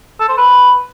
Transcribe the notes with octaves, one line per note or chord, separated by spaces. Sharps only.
A4
C5
B4